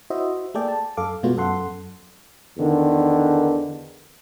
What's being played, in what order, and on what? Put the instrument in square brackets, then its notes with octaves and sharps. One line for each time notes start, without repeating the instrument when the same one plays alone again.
[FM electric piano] E4 F#4 C5 D#5 E5
A3 A#3 G#4 A4 D5 G5
A5
F#2 A4 F5 D6
B2 G#3 A3 B3 F4 F#4
F#2 A4 F#5 C6
[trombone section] E2 D3 D#3